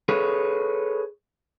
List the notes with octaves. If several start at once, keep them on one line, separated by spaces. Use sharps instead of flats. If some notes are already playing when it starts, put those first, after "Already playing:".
G#4 A4 B4 C#5